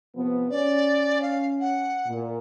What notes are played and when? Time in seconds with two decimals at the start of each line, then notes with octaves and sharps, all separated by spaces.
0.16 C3 F3 B3
0.51 C#4 D5
1.22 F5
1.61 F#5
2.06 A#2